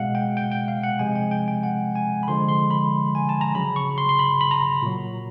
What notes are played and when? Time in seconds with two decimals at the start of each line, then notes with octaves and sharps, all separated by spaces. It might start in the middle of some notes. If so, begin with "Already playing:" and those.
Already playing: B2 G#3 F5 F#5
0.15 G5
0.37 G5
0.52 G5
0.68 F5
0.83 F#5
0.99 C3 F3 G#3 G#5
1.15 G5
1.31 G5
1.48 G5
1.63 F#5
1.95 G#5
2.23 B5
2.28 D3 F3 G#3 C6
2.49 C6
2.70 B5
3.15 G#5
3.29 A5
3.41 A#5
3.55 C#3 F#3 B5
3.76 C#6
3.98 C6
4.09 C6
4.19 B5
4.41 B5
4.51 A#5
4.82 A#2 F#3